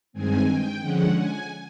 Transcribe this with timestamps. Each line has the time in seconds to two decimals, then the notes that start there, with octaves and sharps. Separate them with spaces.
0.13 G2 D#3 G#3 C4 G#5
0.47 G5
0.80 D3 F3 G#3 C#4 F#5
1.13 G#5